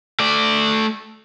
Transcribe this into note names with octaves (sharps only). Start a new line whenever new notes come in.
A3 D5